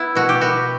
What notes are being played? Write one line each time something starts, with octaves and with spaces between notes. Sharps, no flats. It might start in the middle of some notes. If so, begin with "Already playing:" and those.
Already playing: B3 E4
B2 F#4
G4
B3 F#4